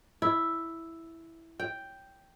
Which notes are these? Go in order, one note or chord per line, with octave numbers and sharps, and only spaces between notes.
E4
G5